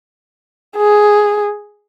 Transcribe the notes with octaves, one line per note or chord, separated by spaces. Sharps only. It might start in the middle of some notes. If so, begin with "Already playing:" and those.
G#4